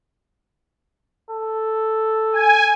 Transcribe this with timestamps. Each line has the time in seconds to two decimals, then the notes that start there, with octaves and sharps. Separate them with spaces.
1.31 A4
2.33 G#5